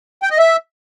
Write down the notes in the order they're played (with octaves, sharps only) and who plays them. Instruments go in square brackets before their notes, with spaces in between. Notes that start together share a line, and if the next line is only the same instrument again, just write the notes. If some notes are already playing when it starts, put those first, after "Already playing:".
[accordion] G5
D#5
E5